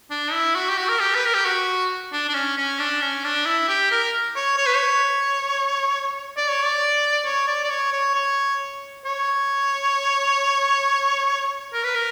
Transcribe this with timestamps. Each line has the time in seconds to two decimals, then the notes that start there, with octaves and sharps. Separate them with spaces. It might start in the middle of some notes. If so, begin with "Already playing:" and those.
0.10 D4
0.33 E4
0.55 F#4
0.69 G4
0.78 F#4
0.89 A#4
1.00 G4
1.15 B4
1.25 A#4
1.34 G4
1.45 F#4
2.13 D4
2.29 D4
2.34 C#4
2.57 C#4
2.79 D4
3.01 C#4
3.24 D4
3.46 E4
3.68 G4
3.91 A#4
4.36 C#5
4.58 C#5
4.67 B4
4.76 C#5
6.37 D5
6.49 C#5
6.62 D5
7.25 C#5
7.47 D5
7.64 D5
7.70 C#5
7.93 C#5
8.15 C#5
9.05 C#5
11.73 A#4
11.84 B4
11.95 A#4